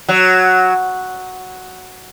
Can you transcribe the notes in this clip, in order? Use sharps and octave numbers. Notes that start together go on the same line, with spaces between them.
F#3